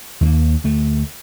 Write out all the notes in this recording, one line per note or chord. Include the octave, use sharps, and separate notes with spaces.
D#2 A3 A#3
D2 A3